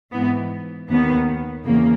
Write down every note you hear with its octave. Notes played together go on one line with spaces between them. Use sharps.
G#2 E3 B3
D#2 D#3 B3
E2 C#3 A#3